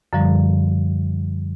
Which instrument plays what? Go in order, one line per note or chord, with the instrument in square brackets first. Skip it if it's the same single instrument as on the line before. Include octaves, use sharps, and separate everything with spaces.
[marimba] F#2 D3 F3 G3